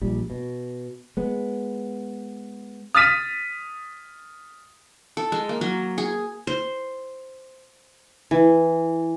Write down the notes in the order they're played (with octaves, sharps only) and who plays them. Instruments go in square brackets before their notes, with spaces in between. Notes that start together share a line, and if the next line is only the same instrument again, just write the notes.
[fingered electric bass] A#1 G3
B2
G#3 B3
[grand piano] D#6 F6 A6 B6 D#7
[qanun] A4
G#3
A#3
F#3
G#4
C5
E3